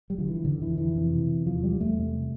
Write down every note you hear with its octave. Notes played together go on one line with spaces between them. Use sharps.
G3
D3 F3
E3
F2 D3
E3
F2
E3
C3
C3
E2 F3
G3
E2
A3
C3